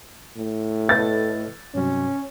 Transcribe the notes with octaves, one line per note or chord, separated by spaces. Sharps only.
A2
A4 B4 D#5 A6
G2 C3 F#3 C#4